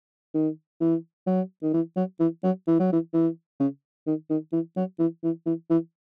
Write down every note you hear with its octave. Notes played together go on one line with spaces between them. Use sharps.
D#3
E3
F#3
D#3
E3
F#3
E3
F#3
E3
F#3
E3
E3
C#3
D#3
D#3
E3
F#3
E3
E3
E3
E3